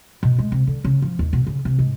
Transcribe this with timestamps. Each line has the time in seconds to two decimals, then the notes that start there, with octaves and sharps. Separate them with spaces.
0.23 B2
0.39 G#3
0.52 C3
0.67 D3
0.84 C#3
1.02 F3
1.19 D#2
1.33 B2
1.47 C#3
1.65 C3
1.79 G#2